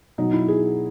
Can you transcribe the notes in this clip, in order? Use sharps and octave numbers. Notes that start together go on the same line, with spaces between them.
B2 F#3 D#4
E4
G#4